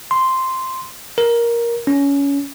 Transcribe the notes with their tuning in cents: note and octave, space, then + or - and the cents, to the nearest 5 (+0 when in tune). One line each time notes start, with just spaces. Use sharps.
C6 -5
A#4 +10
C#4 +20